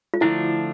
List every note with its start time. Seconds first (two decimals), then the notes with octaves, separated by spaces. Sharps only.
0.14 F4
0.21 D3 F3 A3 D4 E4